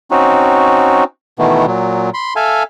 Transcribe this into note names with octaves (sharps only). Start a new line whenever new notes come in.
C4 C#4 D#4 F#4
B2 D#3 E3 A3 B3
A#2 F#3
B5 C6
A4 E5 F5 G#5